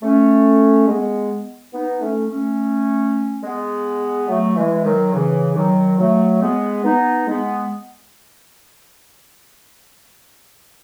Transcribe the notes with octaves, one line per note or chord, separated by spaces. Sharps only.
A3 C#4
G#3 B3
B3 D#4
A3 C#4
A3 C#4
G#3 B3
F#3 A3
E3 G#3
D#3 F#3
C#3 E3
D#3 F#3
F#3 A3
G#3 B3
B3 D#4
G#3 B3